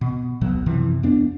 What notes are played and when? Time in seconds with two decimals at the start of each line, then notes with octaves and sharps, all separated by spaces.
0.01 B2
0.41 D1 B1 B2 F#3
0.66 F#2 C3 E3 F3
1.03 F2 B3 D4